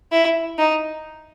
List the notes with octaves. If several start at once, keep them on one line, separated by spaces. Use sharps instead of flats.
E4
D#4